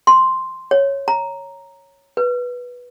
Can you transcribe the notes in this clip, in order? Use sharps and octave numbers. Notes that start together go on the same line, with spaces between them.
C6
C#5
A#5
B4